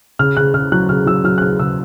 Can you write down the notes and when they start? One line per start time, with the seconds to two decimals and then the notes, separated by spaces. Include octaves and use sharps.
0.19 C#3 F6
0.37 C#3 F#6
0.54 C#3 F6
0.72 F#3 F#6
0.89 C#3 F6
1.06 F#3 E6
1.24 F#3 F6
1.38 F#6
1.42 C#3 F6
1.59 C#3 E6